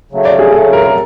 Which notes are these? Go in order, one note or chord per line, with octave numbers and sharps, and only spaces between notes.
C#3 F#3 A3
D5
G#4
C#3 F#3 A3 A4
A#4
A#4